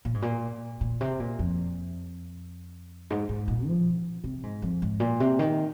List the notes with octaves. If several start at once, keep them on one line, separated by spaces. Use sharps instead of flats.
A#2
G#2
A#2
A#2
C3
A#2
F2
G#2
G#2
A#2
F3
C3
G#2
F2
G#2
A#2
C3
D#3